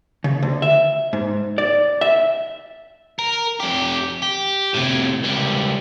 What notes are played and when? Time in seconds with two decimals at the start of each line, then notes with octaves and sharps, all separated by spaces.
0.24 C#3
0.42 D2
0.62 E5
1.13 G#2
1.58 D5
2.01 E5
3.19 A#4
3.60 F2 G4
4.23 G4
4.74 A2 C3
5.23 C#2 G3